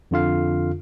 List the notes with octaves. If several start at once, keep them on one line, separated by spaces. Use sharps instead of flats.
F2 D3 F4 F5